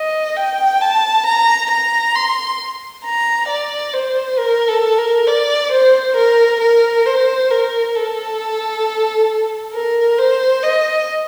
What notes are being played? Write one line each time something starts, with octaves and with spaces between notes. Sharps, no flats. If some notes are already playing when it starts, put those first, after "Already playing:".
Already playing: D#5
G5
A5
A#5
A#5
C6
A#5
D5
C5
A#4
A4
A#4
D5
C5
A#4
A#4
C5
A#4
A4
A#4
C5
D#5